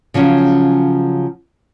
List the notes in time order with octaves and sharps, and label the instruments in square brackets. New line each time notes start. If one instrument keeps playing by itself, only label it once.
[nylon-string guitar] C#3 F3 F#3 C#4